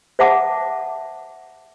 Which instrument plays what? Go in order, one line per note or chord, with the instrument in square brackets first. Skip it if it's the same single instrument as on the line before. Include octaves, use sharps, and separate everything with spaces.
[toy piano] C5 E5 F#5 A5 D6